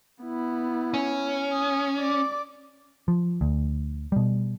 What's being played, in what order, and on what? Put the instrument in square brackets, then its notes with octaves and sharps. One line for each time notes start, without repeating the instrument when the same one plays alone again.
[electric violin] B3 E4
[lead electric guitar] C#4
[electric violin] D#6
D5 D6
[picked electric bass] F3
D2
B2 G3